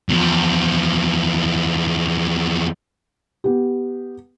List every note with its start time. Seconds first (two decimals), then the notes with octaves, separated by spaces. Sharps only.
0.09 E2 F3
3.44 B3 G4